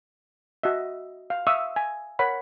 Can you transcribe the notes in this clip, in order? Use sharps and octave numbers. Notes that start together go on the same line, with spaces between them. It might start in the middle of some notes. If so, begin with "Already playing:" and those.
F#4 D#5 E5
F5
E5 F5 C#6 D#6 E6
G#5
A#4 C#5 F#5 B5